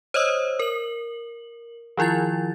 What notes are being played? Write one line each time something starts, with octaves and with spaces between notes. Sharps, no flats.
C5 C#5 D#5 D#6 E6
A#4 F#7
D#3 F3 E4 F4 A6